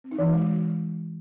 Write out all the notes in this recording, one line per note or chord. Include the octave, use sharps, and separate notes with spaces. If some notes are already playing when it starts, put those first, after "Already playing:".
C4
D#4
E3
F#4
G#3